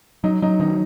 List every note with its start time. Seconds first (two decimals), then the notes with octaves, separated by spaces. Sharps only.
0.24 F#3 D#4
0.42 F#3 D#4
0.60 D#3 D#4